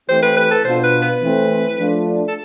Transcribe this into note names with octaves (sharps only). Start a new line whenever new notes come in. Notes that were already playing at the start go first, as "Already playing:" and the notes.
E3 A3 C4 G4 C5
B4
B4
A4
B2 B3 D4 F4 C5
B4
B4
E3 A3 C4
F3 A3 D4 F4
A4